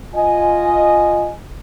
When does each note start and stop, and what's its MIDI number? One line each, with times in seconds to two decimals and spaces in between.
0.15 1.32 65
0.15 1.32 75
0.15 1.32 80